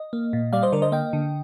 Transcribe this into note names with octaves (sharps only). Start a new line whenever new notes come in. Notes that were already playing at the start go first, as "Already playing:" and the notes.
Already playing: D#5
A#3
A#2
G3 D5 F5
C5 D#5
D3 A#4 D5
C5 D#5
A#3 D#5 G5
D3